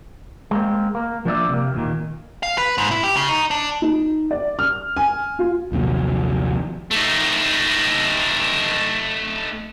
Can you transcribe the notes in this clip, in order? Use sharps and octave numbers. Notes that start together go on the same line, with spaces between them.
G#3 A#3 C4
A#3
F3 A#3 D4 F#4 D5 E5
C3 A#3
D#2 A#2 D#3
F5
B4
G#2
E4
G4
C#3
D#4
D4
D#4
D5
F6
G#5
F4
A#1 D#2 C3 F#3
A3 D#4